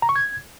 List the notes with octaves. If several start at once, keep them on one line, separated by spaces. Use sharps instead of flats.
A#5
C#6
G#6